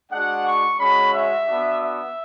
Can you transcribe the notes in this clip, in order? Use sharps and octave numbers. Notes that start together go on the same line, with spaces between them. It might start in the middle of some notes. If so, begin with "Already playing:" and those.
G#3 D4 F#4 F#5
C#6
G#3 C#4 F#4 B5
E5
B3 D4 F#4
E5